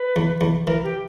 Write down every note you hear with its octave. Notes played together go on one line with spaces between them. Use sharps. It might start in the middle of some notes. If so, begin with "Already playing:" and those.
Already playing: B4
E2
E2
E3 A#4
G4